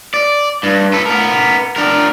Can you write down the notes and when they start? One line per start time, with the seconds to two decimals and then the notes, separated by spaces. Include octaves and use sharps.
0.14 D5
0.63 G2
0.93 A4 B4
1.06 B3 A#4
1.76 D4 A#4